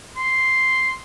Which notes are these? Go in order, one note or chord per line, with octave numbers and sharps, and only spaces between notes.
C6